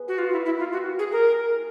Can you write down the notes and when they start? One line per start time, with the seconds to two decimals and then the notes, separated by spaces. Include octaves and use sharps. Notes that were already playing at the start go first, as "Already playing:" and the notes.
Already playing: B3 G#4 B4
0.08 F#4
0.18 D#4 F4
0.32 E4
0.45 A#3 E4
0.59 F4
0.72 F#4 G4
0.99 A#3 G#4
1.12 A#4
1.26 G#4
1.52 E4